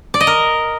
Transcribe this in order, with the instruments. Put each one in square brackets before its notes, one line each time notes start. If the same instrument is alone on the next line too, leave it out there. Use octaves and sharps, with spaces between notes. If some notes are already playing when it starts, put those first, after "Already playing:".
[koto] D5
D#5
A#4